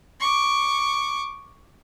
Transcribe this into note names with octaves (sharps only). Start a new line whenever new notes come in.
C#6 D6